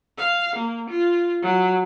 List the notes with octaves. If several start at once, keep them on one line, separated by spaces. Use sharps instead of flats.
F5
A#3
F4
F#3